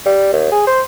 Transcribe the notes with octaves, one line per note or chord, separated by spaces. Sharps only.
G3
D#2
G#4
C5